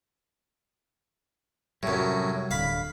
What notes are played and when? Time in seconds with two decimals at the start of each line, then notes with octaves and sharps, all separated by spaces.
1.83 F#2 A2 C3 G3
2.51 D1 D3 F5 B5